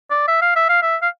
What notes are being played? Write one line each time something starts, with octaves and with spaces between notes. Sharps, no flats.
D5
E5
F5
E5
F5
E5
F5